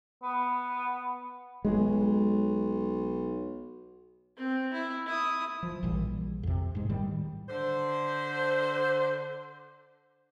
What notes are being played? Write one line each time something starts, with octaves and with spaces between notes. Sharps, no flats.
B3
B1 G#3
C4
E4
E4 D#6
F3
A#1 A2 E3 G3
F2 C3
G#2 G#3
A2 D#3 G3
D3 C5